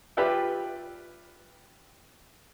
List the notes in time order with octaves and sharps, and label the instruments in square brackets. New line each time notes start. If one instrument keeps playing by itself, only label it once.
[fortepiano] F4 G4 B4 D5 E5 G5